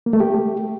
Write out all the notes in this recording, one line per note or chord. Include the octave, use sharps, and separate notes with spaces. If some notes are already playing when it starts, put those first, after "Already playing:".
A#3
A3
G4